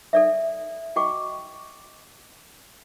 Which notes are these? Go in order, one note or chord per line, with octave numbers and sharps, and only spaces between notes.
A4 D5 E5
F#4 D#5 G5 C#6 D6